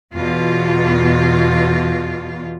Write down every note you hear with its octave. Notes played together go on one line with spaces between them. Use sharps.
E2 B2 F4